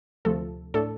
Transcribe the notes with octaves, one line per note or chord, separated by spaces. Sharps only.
D2 C3 F3 A3 A4
A2 A3 D4 A4